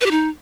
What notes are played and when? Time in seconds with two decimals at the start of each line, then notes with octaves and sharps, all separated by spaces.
0.01 B4
0.06 G4
0.11 D#4